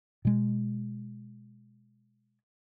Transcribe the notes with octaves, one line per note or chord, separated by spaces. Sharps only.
B2 G#3